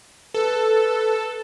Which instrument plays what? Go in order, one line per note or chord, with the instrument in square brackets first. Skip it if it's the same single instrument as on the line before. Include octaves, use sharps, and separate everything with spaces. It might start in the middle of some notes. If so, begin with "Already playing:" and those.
[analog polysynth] A4 [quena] B4